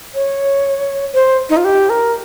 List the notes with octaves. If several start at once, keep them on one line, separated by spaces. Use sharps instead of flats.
C#5
C5
D#4
F4
G4
A#4